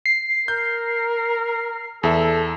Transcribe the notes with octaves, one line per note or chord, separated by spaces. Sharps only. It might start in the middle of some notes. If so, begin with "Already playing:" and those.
C7
A#4 G6
E2 A4 E5